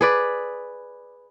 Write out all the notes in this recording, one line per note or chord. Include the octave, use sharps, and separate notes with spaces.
G#4 B4 D5